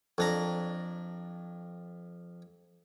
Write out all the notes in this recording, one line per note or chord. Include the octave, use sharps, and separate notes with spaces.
F2 D4 A#5